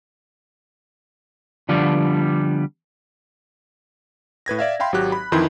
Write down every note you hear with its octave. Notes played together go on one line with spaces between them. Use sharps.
D3 F3 G3 B3 D4
A2 B4 G#6 A#6
D5 E5 F5
E5 F5 G5 B5 C6
G#1 F#3 F#4 G4 F#6
B5
F2 D#3 E3 E4 C6 G6